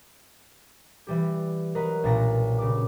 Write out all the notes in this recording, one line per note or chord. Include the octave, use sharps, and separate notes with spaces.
E3 G3 G4
F#3 A#4 B4 D#5
B1 A#2 D4 F#5 A#6
C#3 D6